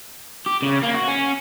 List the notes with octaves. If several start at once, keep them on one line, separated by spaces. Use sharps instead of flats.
G4
C#3
A#3
F#4
C#4